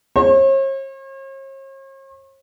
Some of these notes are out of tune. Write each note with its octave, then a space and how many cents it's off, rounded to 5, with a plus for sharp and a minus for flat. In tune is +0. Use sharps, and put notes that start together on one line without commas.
C#5 -45